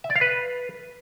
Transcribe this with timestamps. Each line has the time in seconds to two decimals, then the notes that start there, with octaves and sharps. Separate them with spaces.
0.04 E5
0.10 D5
0.16 F5
0.21 B4